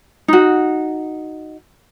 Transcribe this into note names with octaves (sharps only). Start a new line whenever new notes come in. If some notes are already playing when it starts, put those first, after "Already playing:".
D#4 F#4